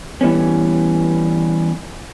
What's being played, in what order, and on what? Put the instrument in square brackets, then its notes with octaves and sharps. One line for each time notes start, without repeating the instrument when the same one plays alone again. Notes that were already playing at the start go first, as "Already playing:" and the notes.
[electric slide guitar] E3 G3 B3 C#4